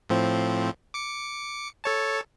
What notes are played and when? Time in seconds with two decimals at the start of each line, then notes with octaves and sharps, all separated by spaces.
0.09 A2 F3 C4
0.94 D6 C#7
1.84 A4 C#5 A5